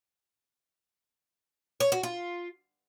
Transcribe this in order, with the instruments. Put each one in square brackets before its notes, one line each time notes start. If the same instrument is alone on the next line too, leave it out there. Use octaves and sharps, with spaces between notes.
[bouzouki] C#5
F#4
F4